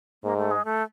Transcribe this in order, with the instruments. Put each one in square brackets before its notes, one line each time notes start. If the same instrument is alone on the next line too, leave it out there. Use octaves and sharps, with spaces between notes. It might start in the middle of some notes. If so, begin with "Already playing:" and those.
[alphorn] G#2 [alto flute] A#3
[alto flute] A3
G#3
A3